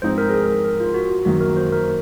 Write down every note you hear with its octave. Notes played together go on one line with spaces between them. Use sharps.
G#2 F3 C4 D#4 C5
A#4
G#4
A#4
A#4
F4
F#4
F#4
F#2 D#3 F#3 A#3 F#4
A#4
C5
A#4